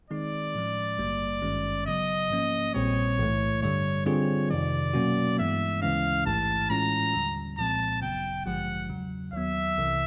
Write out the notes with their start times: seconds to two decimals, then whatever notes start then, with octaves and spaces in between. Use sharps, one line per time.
0.10 D#3 G#3 C4 D#4 G#4 D5
0.55 A2 F3 G#3 C#4
0.98 G#1 G2 D3 G3 A#3
1.42 G#1 G2 D#3 G#3 C#4
1.86 C#3 F#3 B3 D#5
2.30 G#2 F3 A#3 C#4
2.75 A#1 A#2 G3 C4 C#5
3.19 B1 A2 E3 A3
3.62 G2 D3 G3 C#5
4.06 D3 G3 C4 F4 G#4 C#5
4.51 F2 C3 D#3 D5
4.94 B2 F#3 A#3 C#4 F#4
5.38 G2 E3 G#3 B3 E5
5.82 D2 C#3 E3 G#3 C#4 F5
6.26 A1 G#2 E3 A3 A5
6.70 A2 E3 G#3 C#4 F4 A#5
7.14 D#2 D3 G3
7.58 C2 A#2 F3 G#3 C4 A5
8.02 G#1 F#2 C#3 F#3 B3 G5
8.46 A1 G2 D3 F3 G#3 F#5
8.89 E2 C#3 F#3
9.33 D#2 D#3 F#3 B3 E5
9.78 C2 C3 E3